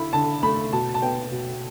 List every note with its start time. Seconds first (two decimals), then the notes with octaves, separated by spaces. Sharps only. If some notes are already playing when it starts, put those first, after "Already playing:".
Already playing: D3 E4 B5
0.13 D3 A5
0.43 A3 B5
0.73 B2 A5
0.94 A5
1.02 B3 G5
1.32 B2